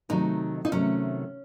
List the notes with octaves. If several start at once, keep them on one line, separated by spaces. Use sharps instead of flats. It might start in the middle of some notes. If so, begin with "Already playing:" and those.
C3 D#3 F#3 A3 D#4
D#4
C3 D#3 F#3 A3 C#4